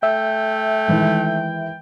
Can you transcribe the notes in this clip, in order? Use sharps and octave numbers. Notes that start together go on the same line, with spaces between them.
A3 E5 G5
D#3 E3 G#3